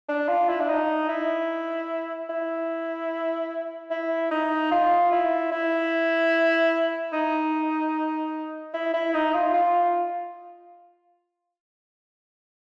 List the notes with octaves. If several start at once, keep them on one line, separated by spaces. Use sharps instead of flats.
D4
F4
E4
D4
D#4
E4
E4
E4
D#4
F4
E4
E4
D#4
E4
E4
D#4
F4
F4